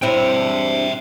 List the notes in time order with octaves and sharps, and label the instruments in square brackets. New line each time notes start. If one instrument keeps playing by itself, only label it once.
[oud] G2 C4 E4 [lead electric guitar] E5 G5